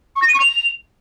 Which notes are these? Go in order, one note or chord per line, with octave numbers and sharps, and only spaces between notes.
C#6
A#6
D#7
C#6
F7